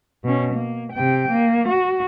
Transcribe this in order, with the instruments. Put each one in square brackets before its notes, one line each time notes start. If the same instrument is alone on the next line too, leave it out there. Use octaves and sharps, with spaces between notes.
[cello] B2 C#4
A#3
C3 G5
A#3
F#4